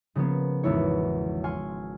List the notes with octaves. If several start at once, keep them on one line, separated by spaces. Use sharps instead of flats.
C#3 F3 A#3 B3 C#4
G#1 E2 B3 E4 C#5
G#5 C6 C#6 F6